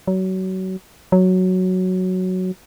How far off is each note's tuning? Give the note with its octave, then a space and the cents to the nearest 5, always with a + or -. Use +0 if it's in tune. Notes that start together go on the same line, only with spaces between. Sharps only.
F#3 +25
F#3 +0